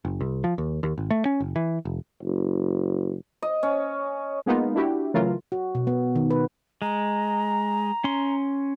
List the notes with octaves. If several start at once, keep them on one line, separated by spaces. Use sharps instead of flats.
F#1
C2
F3
D#2
D#2
G#1
A3
C#4
F#1
E3
F1
F#1
D#5
C#4
G#3 A#3 B3 D#4 F4
D4 E4 F#4 G4
C#3 E3 F#3 A3 F4 A#4
F#4
B2
B3
D#3
B4
G#3 A#5
C#4 C6